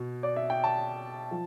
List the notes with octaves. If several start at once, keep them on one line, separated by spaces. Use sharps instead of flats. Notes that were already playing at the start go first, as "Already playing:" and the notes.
Already playing: B2
D5
E5
G5
A5
F3